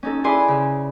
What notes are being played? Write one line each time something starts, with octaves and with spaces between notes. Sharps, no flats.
C#4 D#4 A4
E4 G#4 B4 D5 G#5 C6
C#3